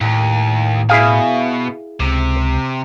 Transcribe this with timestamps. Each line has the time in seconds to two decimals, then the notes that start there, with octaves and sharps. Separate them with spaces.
0.01 D#2 A2
0.89 B2 E4 G#4 F5
2.00 C#2 C3